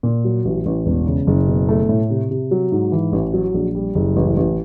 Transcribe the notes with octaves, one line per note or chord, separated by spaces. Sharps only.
A#2
F#3
A1
A1
E1
C#3
F#1
B2
A3
A2
C3
C3
F#3
G#2
E3
A1
F#3
A#1
G3
F#1
A1
A1